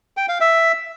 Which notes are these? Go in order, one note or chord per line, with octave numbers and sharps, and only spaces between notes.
G5
F5
E5